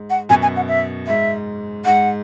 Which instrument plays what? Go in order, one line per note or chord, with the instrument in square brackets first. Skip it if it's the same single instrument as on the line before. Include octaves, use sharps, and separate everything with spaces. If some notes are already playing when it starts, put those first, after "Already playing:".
Already playing: [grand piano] G#2
[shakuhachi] F#5
[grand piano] F#2 B2 [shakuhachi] G#5
[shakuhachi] G#5
F#5
E5
[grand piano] G#2 [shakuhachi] E5
[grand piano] G#2 [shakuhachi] F#5